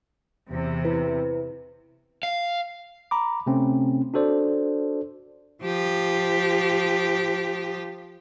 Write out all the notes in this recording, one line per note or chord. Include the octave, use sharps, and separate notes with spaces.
E2 C3
E4 B4
F5
A#5 B5 D6
C3 A3 C4 C#4
D4 F#4 A4 C5 D5
F3 G4